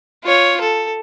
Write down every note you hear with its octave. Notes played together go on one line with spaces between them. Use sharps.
F4 C#5
A4